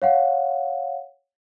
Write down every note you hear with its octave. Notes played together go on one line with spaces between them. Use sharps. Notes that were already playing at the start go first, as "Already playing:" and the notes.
C#5 F5 F#5